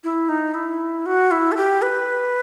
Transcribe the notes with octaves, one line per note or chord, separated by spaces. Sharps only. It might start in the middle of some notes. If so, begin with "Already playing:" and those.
E4
D#4
E4
F#4
E4
A4
G4
B4